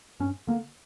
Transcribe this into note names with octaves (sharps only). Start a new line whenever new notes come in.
G2 C#4
D3 A#3